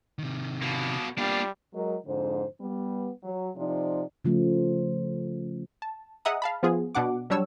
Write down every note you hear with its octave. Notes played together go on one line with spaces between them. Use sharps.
C3 D#3
B2 A#3
G3 A#3 B3 D4 F4
F#3 G#3 A#4 D#5
F2 G#2 D3 C5
G3 B3
F#3
C3 F3 D#4 D5
C#3 F3 A3
A5
G#4 D#5 E5 F#5 A#5 D#6
F5 A5 B5
F3 B3 F4 G#4
B2 D4 F#5 D6
F#3 G3 D4 C#5 E6